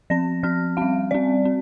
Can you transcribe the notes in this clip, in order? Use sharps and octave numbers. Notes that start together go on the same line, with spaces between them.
F3 C4 A#6
F3 C4 F6
G3 C4 F5
G3 C4 D5
C4